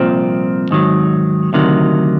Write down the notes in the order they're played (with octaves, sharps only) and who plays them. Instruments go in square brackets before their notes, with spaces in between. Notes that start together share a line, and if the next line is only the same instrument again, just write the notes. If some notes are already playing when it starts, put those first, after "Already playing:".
Already playing: [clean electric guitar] C2 A#2 F3 C4
G#2 D#3 F#3
D2 C3 D#3 F#3